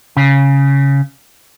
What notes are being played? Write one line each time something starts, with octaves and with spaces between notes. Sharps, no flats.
C#3